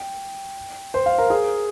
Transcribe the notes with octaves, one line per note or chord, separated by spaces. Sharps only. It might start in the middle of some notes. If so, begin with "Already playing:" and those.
Already playing: G5
C5
F5
A#4
G#4